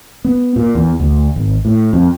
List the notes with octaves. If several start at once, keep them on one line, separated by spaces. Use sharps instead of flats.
B3
A#2
E2
D2
G#1
A2
F2